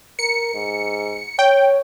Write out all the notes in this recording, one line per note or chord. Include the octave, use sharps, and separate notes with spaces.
A#4 C#7
G#2
C#5 G5